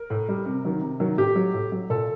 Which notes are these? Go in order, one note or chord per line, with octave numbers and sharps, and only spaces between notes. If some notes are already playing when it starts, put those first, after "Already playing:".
Already playing: A#4
A2
G3
C3
D#3 F#3
C3
D#3 F#3
A2 G4
F#3
A2
F#3
A#2 A4